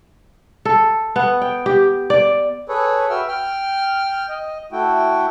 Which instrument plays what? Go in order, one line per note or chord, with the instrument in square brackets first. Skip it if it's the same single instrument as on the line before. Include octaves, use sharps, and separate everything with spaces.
[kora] A4
B3
G5
G4
D5
[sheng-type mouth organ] G#4 A4 B4 C#5
F#4 B4 E5 G5 E6 F6
G5 F6
D#5
A3 E4 F#4 G5